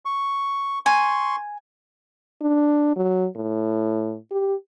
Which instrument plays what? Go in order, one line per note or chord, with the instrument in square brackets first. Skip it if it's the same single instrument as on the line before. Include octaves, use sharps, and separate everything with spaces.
[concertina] C#6
[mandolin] G#5 [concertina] C6 C#6
[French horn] D4
F#3
A2
G4